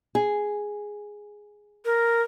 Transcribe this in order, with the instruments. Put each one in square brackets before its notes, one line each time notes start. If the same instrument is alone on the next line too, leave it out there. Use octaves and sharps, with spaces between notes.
[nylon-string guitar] G#4
[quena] A#4